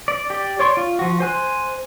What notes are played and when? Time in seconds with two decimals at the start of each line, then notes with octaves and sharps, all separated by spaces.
0.08 D5
0.30 G4 D5
0.59 C#5 D5 C6 C#6
0.77 F4
0.99 F3 F#4
1.20 C5 G#5 F#6